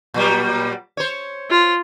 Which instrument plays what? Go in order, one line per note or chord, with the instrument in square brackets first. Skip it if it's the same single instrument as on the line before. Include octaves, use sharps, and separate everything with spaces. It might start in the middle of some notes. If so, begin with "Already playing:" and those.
[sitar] A#2 F#3 G3
C5 C#5
[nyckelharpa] F4